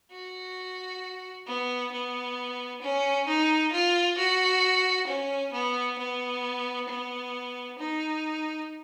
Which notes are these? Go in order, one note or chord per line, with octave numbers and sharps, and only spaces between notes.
F#4
B3
B3
C#4
D#4
F4
F#4
C#4
B3
B3
B3
D#4